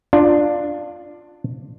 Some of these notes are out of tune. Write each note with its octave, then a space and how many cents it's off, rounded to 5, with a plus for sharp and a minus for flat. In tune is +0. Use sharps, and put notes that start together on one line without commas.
D4 +10 F4 +0